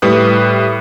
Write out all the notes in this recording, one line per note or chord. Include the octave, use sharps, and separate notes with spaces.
A2 G3 B4 D#6 F#6